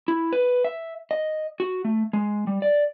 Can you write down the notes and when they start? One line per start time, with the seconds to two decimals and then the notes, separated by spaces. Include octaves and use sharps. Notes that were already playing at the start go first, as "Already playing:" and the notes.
0.08 E4
0.33 B4
0.64 E5
1.11 D#5
1.60 F#4
1.85 A3
2.13 G#3
2.47 G3
2.62 D5